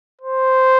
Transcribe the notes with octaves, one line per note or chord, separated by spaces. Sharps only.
C5